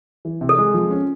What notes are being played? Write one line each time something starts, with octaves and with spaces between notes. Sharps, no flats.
E3
C3
A4
G#3
F3
C#4